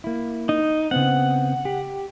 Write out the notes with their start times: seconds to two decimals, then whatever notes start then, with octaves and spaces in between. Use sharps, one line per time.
0.04 A#3 E4
0.49 D#4
0.91 C#3 B3 C4 F#5
1.65 G4